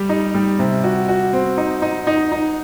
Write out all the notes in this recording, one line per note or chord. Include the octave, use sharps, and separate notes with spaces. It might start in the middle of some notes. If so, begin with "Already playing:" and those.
Already playing: G3 G4
D#4
G3
C3
F#4
F#4
C4
D#4
D#4
D#4
D#4